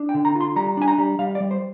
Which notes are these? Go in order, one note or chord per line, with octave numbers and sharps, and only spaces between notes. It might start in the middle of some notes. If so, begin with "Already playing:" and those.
Already playing: D4
G5
D3
A#5
F4
C6
G3 A#5
D4 G#5
A#5
G3
G3 F5
D5
G3
C5